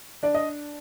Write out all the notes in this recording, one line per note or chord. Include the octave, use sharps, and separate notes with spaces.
D4 D5
D#5